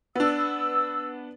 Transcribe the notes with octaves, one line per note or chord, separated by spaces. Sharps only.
B3 D4 E6